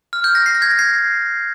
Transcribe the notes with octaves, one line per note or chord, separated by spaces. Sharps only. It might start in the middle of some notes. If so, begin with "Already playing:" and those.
F6
G6
A#6
C7
A#6
G#6
A#6
C7